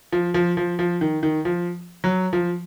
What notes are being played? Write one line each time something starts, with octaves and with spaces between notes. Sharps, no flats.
F3
F3
F3
F3
D#3
D#3
F3
F#3
F3